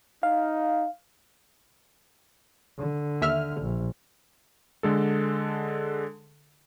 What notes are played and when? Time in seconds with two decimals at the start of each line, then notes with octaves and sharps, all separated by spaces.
0.23 D#4 F5
2.78 D3
3.21 D#2 E5 F6
3.62 A#1
4.83 D3 G#3 A4